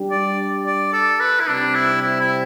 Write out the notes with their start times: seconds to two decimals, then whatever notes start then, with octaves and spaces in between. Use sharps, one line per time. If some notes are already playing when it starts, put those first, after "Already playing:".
Already playing: G3 D4 G4
0.10 D5
0.66 D5
0.93 A4
1.20 B4
1.40 E4
1.47 C3 G3 C4 D4
1.75 E4
2.02 E4
2.20 E4